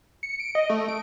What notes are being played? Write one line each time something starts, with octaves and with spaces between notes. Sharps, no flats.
C#7
D7
D#5
A3
D7